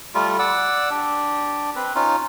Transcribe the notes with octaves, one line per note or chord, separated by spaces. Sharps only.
G3 A3 F4
D5 F#5 E6
D4 G4
C4 B4
C#4 D#4 F4